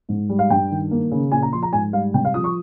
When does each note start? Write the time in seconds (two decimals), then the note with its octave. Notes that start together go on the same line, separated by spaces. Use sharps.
0.09 G#2
0.29 G3
0.39 F5
0.50 G2 G5
0.71 D#3
0.91 A#3
1.11 C#3
1.32 A#2 G#5
1.42 A#5
1.52 F3 C6
1.63 A#5
1.73 G#2 G#5
1.93 G3 F5
2.14 C3 G5
2.25 F5
2.34 F3 D#6
2.44 C#6